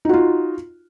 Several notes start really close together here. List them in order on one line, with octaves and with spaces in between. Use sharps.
D#4 F#4 F4